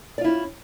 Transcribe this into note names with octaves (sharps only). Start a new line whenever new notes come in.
C#4 E4 F4 D5